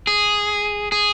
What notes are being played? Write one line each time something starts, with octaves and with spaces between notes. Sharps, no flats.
G#4
G#4